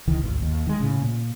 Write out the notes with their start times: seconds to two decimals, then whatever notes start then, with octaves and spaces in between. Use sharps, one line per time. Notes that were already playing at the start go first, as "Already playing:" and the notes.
0.07 C#2 D#3 E3
0.23 G#1 D2
0.42 D#2
0.67 D#3 G#3
0.81 A2 C#3
1.02 A#2